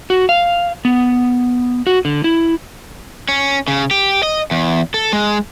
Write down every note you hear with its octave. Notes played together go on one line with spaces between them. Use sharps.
F#4
F5
B3
F#4
D3
E4
C#4
C#3
G4
D#5
E2
A4
G#3